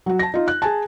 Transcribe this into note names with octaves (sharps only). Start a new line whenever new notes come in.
F#3 F#4
A5 A#6
D#4 F4
F#6
G#4 G#5 A5